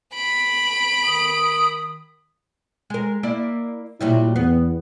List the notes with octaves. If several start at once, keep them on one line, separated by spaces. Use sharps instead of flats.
B5 D7
D#3 D#6
G#3 A#4
A#3 E4 D5
A#2 F#3 G3 E4
E2 B3